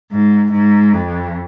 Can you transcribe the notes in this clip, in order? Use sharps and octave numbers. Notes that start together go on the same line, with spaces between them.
G#2
G#2
F2